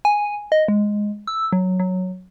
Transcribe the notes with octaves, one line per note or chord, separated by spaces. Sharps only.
G#5
D#5
G#3
E6
F#3
F#3